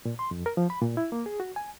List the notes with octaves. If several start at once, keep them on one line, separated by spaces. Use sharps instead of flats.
A#2
C6
F2
A#4
F3
B5
A#2
E4
A#3
G#4
F#4
G#5